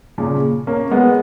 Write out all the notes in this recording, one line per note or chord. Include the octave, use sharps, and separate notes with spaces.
A#2 C#3
A#3 C#4
G#3 B3